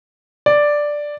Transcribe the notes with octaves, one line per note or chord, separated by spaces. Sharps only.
D5